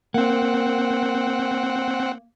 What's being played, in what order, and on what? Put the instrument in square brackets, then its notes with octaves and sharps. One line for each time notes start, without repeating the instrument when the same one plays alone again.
[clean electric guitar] A#3 [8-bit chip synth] C4 F#5